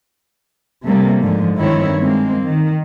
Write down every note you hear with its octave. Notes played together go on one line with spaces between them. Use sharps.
C3 G3 A3 A#3
G#2 D3 F3
G2 D#3 C4 E4 C#5
G#3 A#3 C4
D#3